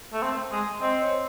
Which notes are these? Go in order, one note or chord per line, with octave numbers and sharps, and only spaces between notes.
A3
C4
G#3
C4 D#5
C#5